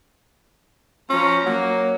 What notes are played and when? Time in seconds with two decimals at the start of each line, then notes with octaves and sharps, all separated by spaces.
1.09 F3 C#4 A#5
1.46 F#3 A#3